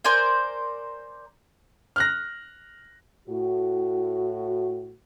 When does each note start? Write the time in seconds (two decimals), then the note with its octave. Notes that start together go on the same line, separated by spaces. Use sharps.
0.04 A#4 C5 D5 G#5
1.96 F6 F#6 A#6
3.28 A2 F#4